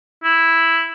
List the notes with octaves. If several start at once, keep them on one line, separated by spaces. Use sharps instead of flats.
E4